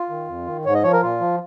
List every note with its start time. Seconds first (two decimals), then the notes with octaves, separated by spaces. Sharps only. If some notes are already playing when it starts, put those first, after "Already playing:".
Already playing: F4
0.10 D#3
0.28 F2
0.47 D#3
0.65 G#2 C#5
0.74 D#5
0.83 F3 C#5
0.93 A#4
1.02 A#2 F4
1.20 F3